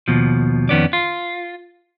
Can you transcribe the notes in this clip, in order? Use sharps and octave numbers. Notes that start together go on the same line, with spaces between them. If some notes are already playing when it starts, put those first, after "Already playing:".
D#2 B2 F3
F2 D#3 B3 C#4 D5
F4